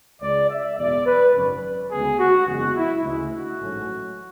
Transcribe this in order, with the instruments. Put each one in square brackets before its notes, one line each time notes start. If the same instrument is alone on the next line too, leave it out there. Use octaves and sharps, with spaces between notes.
[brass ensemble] C#2 C#3 G#3 D5
E5
F#1 E2 B2 G#3 D5
B4
G#1 F#2 C#3 F#3 C#4
D2 C#3 G#3 B3 G#4
F#4
F#1 E2 C#3 G#3 F#4
E4
D2 C#3 E3 G#3
F#4
A1 G#2 F#3 A3 C#4